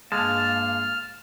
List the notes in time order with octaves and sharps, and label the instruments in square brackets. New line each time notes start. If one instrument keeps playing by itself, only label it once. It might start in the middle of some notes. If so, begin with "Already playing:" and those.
[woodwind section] G2 A#3 F5 [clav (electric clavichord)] G#3 [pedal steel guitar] A5 [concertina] F6